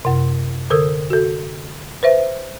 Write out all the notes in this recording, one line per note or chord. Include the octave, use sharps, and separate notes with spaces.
F#2 C3
D3 A4 A#4 D#6 E6
F#4 A4
B4 C5 E5